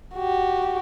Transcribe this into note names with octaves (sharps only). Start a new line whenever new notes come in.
F#4 G4